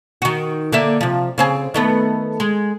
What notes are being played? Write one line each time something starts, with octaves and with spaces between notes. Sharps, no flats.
D#3 F#4
D3 A#3 E5
C3 F3
C#3 C4 G#4
D#3 A3 B3
G#3